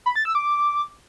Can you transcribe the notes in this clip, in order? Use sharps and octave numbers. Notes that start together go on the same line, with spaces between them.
B5
A6
E6
D6